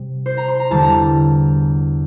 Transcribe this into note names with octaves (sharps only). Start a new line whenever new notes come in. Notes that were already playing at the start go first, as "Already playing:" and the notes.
Already playing: C3 G3
C5
A#5
C6
A#5
E2 D3 G3 D4 A5
A#5